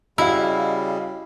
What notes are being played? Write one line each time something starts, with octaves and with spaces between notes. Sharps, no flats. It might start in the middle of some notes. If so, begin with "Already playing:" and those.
C#3 G3 E4 F#4 D#5 F5